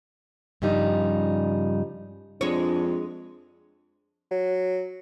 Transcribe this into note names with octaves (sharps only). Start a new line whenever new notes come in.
G2 C#3 F3 G3 D#4
F2 G#3 D4 C#5
F#3